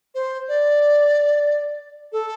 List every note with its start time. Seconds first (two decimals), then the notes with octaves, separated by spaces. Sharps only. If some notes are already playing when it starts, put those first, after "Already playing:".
0.15 C5
0.48 D5
2.12 A4